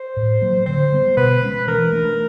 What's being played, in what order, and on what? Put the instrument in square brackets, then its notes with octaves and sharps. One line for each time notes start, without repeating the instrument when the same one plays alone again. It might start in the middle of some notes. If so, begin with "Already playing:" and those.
Already playing: [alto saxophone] C5
[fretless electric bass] A2
F#3 A#3
[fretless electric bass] D3 [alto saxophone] C5
[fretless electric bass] G3 B3
[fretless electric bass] B2 [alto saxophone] B4
[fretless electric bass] G#3 C#4
[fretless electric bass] E3 [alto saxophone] A#4
[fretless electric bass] A3 D4